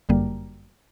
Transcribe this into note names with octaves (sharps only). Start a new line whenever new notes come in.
G1 F#2 D3 G3 A#3